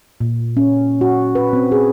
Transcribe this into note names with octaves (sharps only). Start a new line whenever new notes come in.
A#2
C#4
F#4
B4
C4
G#4